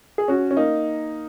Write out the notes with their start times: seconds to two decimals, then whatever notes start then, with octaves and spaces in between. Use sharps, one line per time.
0.18 G#4
0.28 C#4 F#4
0.51 C#4
0.57 A#3 D#4